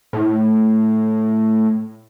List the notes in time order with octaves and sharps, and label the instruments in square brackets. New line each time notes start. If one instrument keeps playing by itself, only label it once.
[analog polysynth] A2